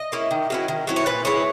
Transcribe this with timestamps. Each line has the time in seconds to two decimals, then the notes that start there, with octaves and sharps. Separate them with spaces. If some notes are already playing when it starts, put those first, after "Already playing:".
Already playing: D#5
0.12 A#3 C#4 E4
0.31 D#3
0.50 F#3 C#4 E4
0.68 D#3
0.87 F#3 C#4 E4
0.96 C#5
1.06 A#2 B4
1.25 G#3 B3 E4 C#5